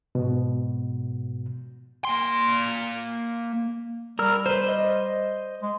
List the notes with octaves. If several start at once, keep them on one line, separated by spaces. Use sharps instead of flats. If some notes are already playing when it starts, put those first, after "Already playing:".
G#2 B2
A#3 C6
G3 A#4 E6 F6
B4 C5
C5 D#5
G#3